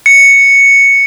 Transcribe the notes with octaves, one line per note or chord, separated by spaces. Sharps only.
C#7